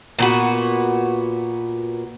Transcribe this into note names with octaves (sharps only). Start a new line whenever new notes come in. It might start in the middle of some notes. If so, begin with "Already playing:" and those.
A#2 B3 F#4